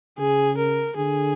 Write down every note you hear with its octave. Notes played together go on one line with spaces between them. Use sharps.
C#3 G#4
A#4
D3 G#4